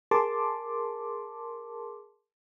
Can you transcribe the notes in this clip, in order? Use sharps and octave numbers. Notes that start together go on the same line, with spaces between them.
G#4 A#4 A5 C6 D6